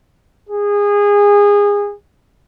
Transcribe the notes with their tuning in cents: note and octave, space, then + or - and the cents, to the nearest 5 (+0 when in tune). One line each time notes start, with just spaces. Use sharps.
G#4 -25